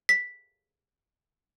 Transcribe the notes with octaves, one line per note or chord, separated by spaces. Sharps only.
B6